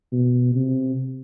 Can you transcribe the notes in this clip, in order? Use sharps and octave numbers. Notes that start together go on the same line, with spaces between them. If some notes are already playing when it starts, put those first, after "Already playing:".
B2
C3